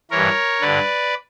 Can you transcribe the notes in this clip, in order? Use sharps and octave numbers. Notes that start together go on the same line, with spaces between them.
G2 E3 A#4 C#5
G2 D3 B4 D5